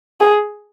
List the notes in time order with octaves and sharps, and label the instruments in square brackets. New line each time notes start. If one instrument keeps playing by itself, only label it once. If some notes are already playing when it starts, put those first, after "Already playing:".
[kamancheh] G#4